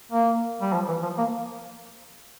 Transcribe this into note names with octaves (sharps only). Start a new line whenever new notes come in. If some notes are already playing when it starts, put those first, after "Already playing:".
A#3
G3
F3
E3
F3
A#3